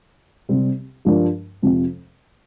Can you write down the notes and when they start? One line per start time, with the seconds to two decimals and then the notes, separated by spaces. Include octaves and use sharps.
0.49 C2 C3 G3 C4
1.05 G2 F3 D4 A#4
1.63 F2 C3 F3